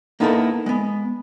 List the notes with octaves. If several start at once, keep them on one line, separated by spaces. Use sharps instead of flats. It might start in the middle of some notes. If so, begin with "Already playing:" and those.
A#3 B3 D#4 E4 A4 A#4
G#3 B3